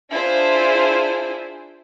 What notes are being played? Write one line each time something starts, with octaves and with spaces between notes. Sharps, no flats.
D4 E4 F4 G#4 C5